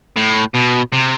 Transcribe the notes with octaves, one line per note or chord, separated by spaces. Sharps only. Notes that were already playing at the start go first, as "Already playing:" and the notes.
A2
B2
C3